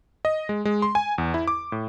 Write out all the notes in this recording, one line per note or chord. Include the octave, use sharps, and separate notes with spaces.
D#5
G#3
G#3
C6
G#5
E2
E4
D6
A2